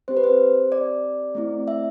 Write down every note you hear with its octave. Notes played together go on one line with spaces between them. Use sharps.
C4 G4 C5
B4
C5
D5
A3 C4 E4
E5